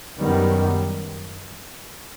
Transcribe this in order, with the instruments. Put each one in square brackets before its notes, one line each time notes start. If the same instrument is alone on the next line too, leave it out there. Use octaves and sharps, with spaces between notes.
[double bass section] F#2 D#3 G3 B3